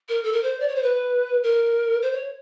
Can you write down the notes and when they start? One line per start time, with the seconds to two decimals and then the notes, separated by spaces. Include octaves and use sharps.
0.09 A#4
0.23 A4
0.33 A#4
0.43 C5
0.60 D5
0.68 C#5
0.75 C5
0.83 B4
1.43 A#4
2.02 C5
2.13 C#5